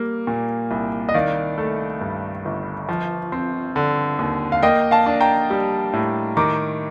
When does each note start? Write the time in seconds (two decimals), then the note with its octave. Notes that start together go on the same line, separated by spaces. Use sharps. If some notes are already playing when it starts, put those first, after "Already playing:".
Already playing: G3 A#3
0.27 A#2
0.71 C2
1.09 D#5
1.14 D#3 D5 F5
1.58 A3
2.01 G2
2.45 G1
2.89 F3
3.32 C4
3.76 D3
4.19 D#2
4.52 F5
4.63 A#3 D#5 G5
4.91 F5 A5
5.06 D4
5.21 G5 A#5
5.50 G3
5.93 A2
6.37 D#3 A#5 D6